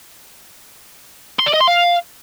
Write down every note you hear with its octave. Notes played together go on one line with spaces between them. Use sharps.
C6
D5
D#5
C6
F5